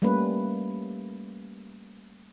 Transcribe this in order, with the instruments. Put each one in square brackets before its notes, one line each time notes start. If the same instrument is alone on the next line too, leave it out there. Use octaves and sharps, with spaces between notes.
[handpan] G3 A3 A#3 C#4 B4